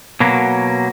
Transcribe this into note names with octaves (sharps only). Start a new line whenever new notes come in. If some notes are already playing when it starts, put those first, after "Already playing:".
B2 F#3 A#3